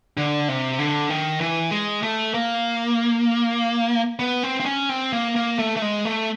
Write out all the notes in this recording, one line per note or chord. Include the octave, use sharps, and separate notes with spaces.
D3
C3
D3
D#3
E3
G#3
A3
A#3
B3
C4
C4
C#4
C4
A#3
A#3
A3
A3
G#3
A3